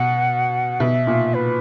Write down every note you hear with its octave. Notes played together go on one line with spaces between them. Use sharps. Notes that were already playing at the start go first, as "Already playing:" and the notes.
Already playing: B2 F#5
B2 E5
A#2
B4